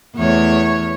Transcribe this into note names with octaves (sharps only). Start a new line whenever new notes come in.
E2 A3 C#5